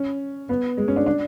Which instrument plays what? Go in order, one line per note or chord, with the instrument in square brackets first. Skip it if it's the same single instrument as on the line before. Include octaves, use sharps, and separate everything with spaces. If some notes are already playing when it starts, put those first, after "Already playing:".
Already playing: [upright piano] C#4
B3
G#3
C#4
D4
D4